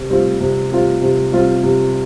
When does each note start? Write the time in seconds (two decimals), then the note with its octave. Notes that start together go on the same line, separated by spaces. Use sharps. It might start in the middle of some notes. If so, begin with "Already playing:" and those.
Already playing: C3
0.10 G3 C4 F4
0.40 C3
0.71 G3 C4 F4
1.01 C3
1.32 G3 C4 F4
1.63 C3